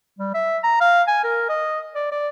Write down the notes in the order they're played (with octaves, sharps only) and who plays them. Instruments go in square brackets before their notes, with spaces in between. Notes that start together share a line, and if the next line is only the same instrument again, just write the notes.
[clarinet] G3
E5
A#5
F5
G#5
A#4
D#5
D5
D5